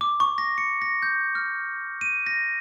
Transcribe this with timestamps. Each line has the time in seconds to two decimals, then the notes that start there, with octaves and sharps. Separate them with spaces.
0.01 D6
0.20 C#6
0.38 A#6
0.58 C#7
0.82 A#6
1.02 G6
1.35 F6
2.01 D#7
2.26 A#6